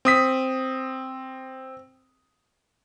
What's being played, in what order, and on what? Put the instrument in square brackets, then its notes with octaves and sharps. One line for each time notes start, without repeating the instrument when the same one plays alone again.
[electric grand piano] C4 D#6 B6